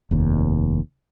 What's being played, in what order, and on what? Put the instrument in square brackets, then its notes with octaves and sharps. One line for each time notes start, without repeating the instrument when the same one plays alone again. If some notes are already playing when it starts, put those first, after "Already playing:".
[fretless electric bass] F1 D#2